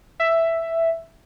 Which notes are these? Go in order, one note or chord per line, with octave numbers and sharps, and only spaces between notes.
E5